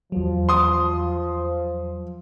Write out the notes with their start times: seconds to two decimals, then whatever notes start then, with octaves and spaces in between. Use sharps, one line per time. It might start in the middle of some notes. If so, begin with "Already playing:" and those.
0.12 E2 F3 F#3
0.49 C6 D#6